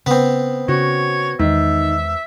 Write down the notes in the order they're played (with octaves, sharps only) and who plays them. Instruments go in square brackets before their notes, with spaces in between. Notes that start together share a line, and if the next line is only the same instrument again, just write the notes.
[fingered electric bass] C#3 [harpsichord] B3 C4
[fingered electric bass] C#3 [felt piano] F#4 [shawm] C#5
[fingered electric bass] E2 G#3 [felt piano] D#3 [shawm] E5